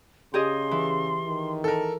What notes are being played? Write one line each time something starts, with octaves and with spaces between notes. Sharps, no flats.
C#3 G4 G#4 D#5 C6
E3
D#3
A4 A#4